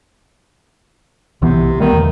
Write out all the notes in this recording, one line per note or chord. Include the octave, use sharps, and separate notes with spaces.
B1 C3 E3 B3
D#3 G3 A3 B3
E2 C#3